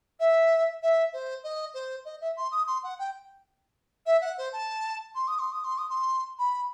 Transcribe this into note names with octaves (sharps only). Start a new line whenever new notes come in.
E5
E5
C5
D#5
C5
D#5
E5
C6
D#6
C6
F#5
G5
E5
F#5
C5
A5
C6
D#6
C6
D#6
C6
D#6
C6
B5